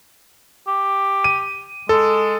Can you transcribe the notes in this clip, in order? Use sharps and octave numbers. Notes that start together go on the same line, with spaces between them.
G4
D#7
G#3 A4